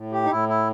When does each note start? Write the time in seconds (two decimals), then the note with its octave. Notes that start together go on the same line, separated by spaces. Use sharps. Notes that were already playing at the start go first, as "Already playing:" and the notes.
Already playing: A2
0.12 G4
0.25 D#4
0.31 A2 E4
0.49 E4